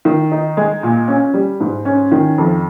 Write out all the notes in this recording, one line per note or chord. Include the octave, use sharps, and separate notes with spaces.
D#3
D#4
G#3
A#2
C#4
G3
G#2
C#4
D#3
F2